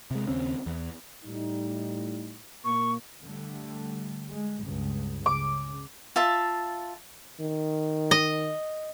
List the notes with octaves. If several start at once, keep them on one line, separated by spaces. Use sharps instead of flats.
C3 G#3
D#2 C#3 C4 C#4
E2
A2 G3 D#4
A#2 A#3 C#6
D3 G3 A3
G#3
C#2 G2 C#3
C#3 D6
F4 E5 A5
D#3
D#5